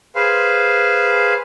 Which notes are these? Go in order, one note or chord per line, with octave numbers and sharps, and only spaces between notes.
G#4 B4 C5 F5